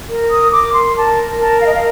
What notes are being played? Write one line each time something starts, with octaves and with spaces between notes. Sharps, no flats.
A#4
D#6
A#4 D6
C6
A#4 A5
A#4 A5
F5
D#5
F5